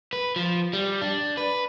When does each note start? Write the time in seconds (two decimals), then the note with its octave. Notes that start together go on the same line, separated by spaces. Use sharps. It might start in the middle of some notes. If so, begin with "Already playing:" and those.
0.13 B4
0.36 F3
0.73 G3
1.01 D4
1.37 B4